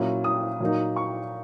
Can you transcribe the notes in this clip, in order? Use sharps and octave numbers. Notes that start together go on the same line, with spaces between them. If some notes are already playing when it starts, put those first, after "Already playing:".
Already playing: A#2 F#3 C#4 E4
D#6
A#2 F#3 A#3 D#4
C#6